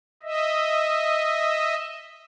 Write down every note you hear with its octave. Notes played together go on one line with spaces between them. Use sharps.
D#5 E5